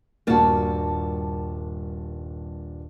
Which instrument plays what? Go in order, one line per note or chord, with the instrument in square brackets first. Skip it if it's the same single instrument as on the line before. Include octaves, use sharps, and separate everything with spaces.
[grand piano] D#1 G2 D4 [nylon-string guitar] A#3 F#4 [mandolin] C4 A5 F6